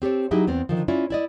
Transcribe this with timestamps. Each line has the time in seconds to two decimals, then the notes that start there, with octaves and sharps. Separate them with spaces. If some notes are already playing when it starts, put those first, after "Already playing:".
0.02 C4 G4 A4 C#5
0.31 F#3 D#4 E4 G4 G#4
0.47 E2 B3 C4
0.69 D3 D#3 F3
0.88 C#4 E4 F4 D5
1.10 E4 D5 D#5